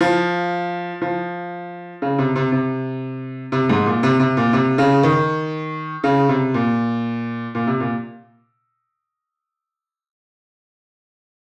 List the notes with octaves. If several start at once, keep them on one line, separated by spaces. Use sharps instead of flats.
F3
F3
C#3
C3
C3
C3
C3
G#2
A#2
C3
C3
A#2
C3
C#3
D#3
C#3
C3
A#2
A#2
C3
A#2